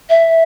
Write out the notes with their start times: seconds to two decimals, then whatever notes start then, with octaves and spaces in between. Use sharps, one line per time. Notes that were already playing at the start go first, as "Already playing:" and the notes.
0.10 E5